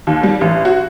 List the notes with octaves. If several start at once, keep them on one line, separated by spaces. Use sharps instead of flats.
D#2
G3
A1
F#4